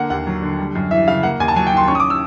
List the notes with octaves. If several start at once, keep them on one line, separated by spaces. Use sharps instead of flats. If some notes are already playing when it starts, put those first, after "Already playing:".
Already playing: D3 A#3 F#5
D#2 F#5
F#3
D3
G3
F#2
E3 E5
C#3 F5
A#3 F#5
D#2 G#5
A5
F#3 G#5
G5
D#3 C6
C#4 C#6
D#6
D6
E6